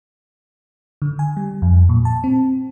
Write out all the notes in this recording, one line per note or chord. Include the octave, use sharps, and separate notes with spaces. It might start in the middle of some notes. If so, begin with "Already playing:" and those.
D3
G#5
G3
F2
A#2
A5
C4